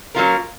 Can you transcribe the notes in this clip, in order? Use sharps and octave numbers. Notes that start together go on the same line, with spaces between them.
F#3 A#3 C#4 F4 A#4